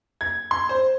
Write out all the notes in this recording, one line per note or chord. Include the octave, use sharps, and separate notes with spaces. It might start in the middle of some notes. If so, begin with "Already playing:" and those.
G#6
C6
C5